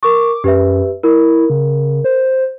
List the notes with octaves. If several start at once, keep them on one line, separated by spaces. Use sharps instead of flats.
A#4 C#6 D6
F#2 G4 B4 E5
E4 A#4
C#3
C5